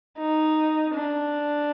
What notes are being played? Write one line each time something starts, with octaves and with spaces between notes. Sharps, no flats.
D#4
D4